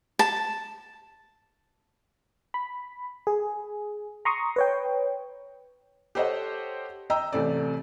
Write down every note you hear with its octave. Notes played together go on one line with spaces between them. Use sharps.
A5
B5
G#4
A#5 C6 C#6 D#6
B4 C#5 G5
G4 A4 C5 C#5 D#5 F#5
D#5 G5 A#5 E6
A1 C3 A3 C4 D5